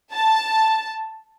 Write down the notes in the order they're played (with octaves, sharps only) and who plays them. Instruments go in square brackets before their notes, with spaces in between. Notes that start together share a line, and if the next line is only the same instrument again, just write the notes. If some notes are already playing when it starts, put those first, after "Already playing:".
[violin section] A5